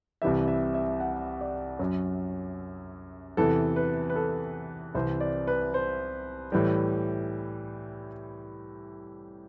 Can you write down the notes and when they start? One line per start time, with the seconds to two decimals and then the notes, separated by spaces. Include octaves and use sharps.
0.22 C2 C3 E3 G3 E5
0.48 E5
0.74 E5
1.00 F#5
1.41 D5
1.79 F#2 F#3
3.37 E2 C3 E3 A4
3.76 B4
4.10 B4
4.16 A4
4.95 C2 C3 E3 C5
5.20 D5
5.47 B4
5.74 C5
6.52 A2 E3 G3